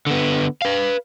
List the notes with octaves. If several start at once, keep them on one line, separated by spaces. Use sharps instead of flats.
D3 B3
B4 F5